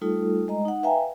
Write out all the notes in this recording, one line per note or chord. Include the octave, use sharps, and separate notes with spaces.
G3 A3 D#4 F4 A4
G#3 D#5 A#5
D#4 F#5
B4 E5 F5 G5 G#5 A#5